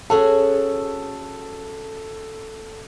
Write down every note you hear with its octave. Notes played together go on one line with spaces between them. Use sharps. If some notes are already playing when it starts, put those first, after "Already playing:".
C#4 F#4 G#4 A4